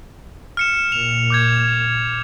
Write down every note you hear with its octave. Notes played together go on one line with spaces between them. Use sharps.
F6 C#7 E7
A#2 F7
D6 G6 G#6